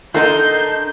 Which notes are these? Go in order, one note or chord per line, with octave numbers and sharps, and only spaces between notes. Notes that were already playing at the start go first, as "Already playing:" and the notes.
D4 D#4 A4 A#4 F#5 C6 G6